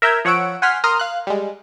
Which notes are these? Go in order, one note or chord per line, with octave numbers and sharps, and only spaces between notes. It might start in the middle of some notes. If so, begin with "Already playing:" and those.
A#4 E5 A#5 G6 G#6
F3 C#5 F#5 E6 D7
F#5 G#5 C6 F6 B6
A#4 A#5 C6 D#6 F6
F5 F#6
G3 G#3